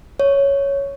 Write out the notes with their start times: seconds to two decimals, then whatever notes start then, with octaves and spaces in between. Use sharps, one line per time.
0.20 C#5